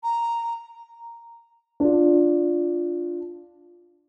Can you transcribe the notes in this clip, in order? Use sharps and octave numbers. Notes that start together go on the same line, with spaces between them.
A#5
D4 F4